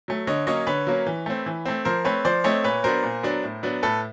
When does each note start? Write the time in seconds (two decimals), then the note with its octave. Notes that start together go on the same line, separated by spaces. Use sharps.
0.08 F#3 A3
0.27 D3 C#5 D#5
0.47 F#3 A#3 C#4 C#5 D#5
0.67 D3 B4 C#5
0.87 F#3 A#3 C#4
1.07 E3
1.26 A3 C4
1.46 E3
1.65 A3 C4
1.85 F3 A#4 C5
2.05 A3 C4 B4 C#5
2.25 F3 C5 D5
2.44 A3 C4 C#5 D#5
2.64 A#2 B4 C#5
2.84 F#3 B3 D4 A#4 C5
3.03 A#2
3.23 F#3 B3 D4
3.43 A2
3.63 F#3 B3 D4
3.83 A2 A4 B4